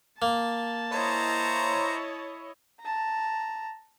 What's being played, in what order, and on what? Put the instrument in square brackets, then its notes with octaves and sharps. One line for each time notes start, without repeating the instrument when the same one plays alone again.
[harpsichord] A#3 [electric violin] A5
[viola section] E4 C#5 D#5 [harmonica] C5 A#5
[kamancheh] A5 A#5